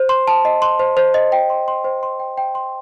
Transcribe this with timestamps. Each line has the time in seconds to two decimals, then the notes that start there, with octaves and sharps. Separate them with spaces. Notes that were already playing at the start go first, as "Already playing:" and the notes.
Already playing: C5
0.09 C6
0.28 A5
0.45 D#5
0.62 C6
0.79 C5
0.97 C5
1.14 D#5
1.32 G5
1.50 C6
1.68 C6
1.84 C5
2.03 C6
2.20 G5
2.38 G5
2.55 C6